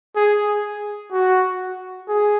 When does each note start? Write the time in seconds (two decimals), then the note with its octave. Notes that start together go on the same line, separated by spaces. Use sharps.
0.16 G#4
1.12 F#4
2.09 G#4